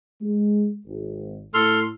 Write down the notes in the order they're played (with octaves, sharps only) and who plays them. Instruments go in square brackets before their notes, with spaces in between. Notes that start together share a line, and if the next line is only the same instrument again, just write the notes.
[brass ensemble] G#3
G#1
[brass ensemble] A2 [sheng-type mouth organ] A4 C6 F6